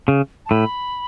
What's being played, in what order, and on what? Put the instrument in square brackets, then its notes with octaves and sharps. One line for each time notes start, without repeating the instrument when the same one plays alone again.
[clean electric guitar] C#3
[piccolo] A5
[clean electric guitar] A2 [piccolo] B5